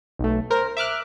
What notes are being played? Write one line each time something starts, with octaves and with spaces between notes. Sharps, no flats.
B1 A3
A#4 C5
E5 D6 F6 F#6